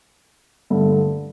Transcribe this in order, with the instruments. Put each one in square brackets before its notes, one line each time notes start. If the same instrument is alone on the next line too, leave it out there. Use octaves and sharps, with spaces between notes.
[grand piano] G2 D3 A3